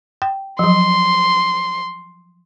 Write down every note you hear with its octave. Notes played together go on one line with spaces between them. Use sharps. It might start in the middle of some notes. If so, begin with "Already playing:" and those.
G5
F3 F#3 C6